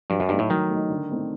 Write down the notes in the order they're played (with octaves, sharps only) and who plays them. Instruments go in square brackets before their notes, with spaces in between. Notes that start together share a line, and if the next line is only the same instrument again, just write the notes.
[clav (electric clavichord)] G2 [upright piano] F#3
[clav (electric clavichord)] F#2
[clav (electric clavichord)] G2 [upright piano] A3 D#4
[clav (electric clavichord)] A2
[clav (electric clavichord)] D#3 [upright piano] F#3
[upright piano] A3 D#4
D3
A3 C4 D#4